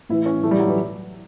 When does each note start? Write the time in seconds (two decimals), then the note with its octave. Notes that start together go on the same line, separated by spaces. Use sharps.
0.09 A2 E3 E4
0.26 C#4
0.43 A2 E3 A3
0.51 G3
0.59 F#3
0.68 E3